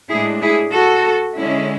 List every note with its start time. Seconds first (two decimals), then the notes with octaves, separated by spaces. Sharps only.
0.09 A2 G#3 D4 E4 G#4
0.41 E4 G#4
0.72 F#4 A4
1.35 D3 G#3 C#4 E4